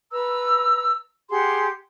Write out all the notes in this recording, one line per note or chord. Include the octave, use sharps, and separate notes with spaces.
B4 A#5 E6
G4 G#4 F#5 C6